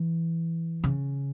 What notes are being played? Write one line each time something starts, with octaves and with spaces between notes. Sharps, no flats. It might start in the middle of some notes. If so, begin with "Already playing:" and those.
Already playing: E3
C#3